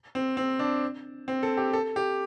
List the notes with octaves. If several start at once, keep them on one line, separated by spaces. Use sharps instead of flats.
C4
C4
D4
C4
A4
G4
A4
G4